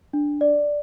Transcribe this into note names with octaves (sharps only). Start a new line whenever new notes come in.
D4
D5